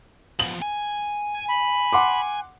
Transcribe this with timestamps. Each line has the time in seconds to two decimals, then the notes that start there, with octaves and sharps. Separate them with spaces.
0.39 F3 B3 F#7
0.62 G#5
1.48 B5
1.93 F#5 C6 D6